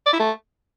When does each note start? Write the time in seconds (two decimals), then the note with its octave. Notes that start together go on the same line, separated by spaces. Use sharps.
0.06 D5
0.13 E4
0.20 A3